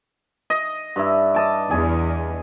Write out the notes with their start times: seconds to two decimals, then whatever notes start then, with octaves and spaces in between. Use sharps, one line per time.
0.50 D#5
0.96 G2 E4
1.34 D#5 A5 D6
1.71 E2 G#4